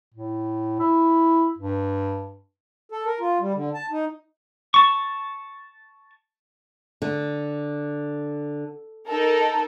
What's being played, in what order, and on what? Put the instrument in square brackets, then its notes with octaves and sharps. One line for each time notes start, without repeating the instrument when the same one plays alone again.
[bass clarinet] A2
E4
G2
[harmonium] A4
A#4
F4
G3
D3
A5
D#4
[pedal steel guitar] A5 C#6
[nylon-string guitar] D3
[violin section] D#4 A4 A#4